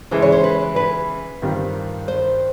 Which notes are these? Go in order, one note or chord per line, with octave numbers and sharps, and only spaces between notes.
C#3 E3 G#3 C5
C#5
C5
B4
B4
G2 D#3 G3 C4 F4
C5